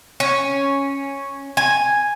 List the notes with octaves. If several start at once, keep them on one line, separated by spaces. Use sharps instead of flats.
C#4
G#5